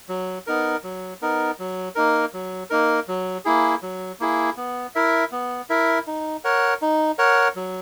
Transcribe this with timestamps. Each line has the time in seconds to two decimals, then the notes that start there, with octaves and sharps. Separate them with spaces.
0.09 F#3
0.47 B3 D#4 A#4
0.84 F#3
1.22 B3 D#4 A#4
1.59 F#3
1.95 A#3 D#4 A#4
2.34 F#3
2.70 A#3 D#4 A#4
3.08 F#3
3.45 A#3 E4 G#4
3.82 F#3
4.20 A#3 E4 G#4
4.57 B3
4.95 E4 A#4 E5
5.32 B3
5.70 E4 A#4 E5
6.07 D#4
6.44 A#4 C#5 F#5
6.82 D#4
7.18 A#4 C#5 F#5
7.56 F#3